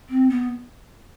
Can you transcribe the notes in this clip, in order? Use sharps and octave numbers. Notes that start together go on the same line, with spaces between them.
C4
B3